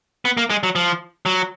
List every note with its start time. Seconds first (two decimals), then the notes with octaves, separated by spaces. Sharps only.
0.25 B3
0.37 A#3
0.50 G#3
0.63 F#3
0.75 F3
1.26 F#3